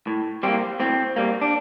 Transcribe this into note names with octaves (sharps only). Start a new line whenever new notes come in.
A2
G3 A#3 C4
A2 C4
G3 A#3
D4